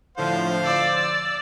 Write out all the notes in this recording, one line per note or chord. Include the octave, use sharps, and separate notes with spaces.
A2 D3 F3 C5 F5
D5 E6